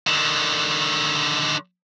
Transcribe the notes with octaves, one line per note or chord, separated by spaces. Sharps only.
D3 D#3